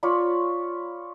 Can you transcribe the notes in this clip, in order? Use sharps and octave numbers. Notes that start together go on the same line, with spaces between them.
F4 C#5 D5 B5